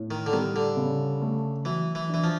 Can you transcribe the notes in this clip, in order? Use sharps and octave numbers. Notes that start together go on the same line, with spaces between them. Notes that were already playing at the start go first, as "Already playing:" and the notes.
Already playing: A2
D#3
D3
D#3 G3
D3
C#3
A3
E3 F#3
E3
E3 D4
F3